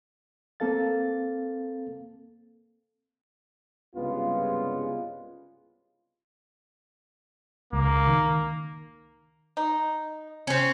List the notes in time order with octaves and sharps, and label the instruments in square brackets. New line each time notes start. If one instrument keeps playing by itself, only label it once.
[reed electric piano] A#3 C4 A4 F5 A6
[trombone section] C2 G2 C#3 G#3 B3 F4
[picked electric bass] C#2 [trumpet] A#3
[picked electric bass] D#3
[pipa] D#4
[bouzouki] C4 C#4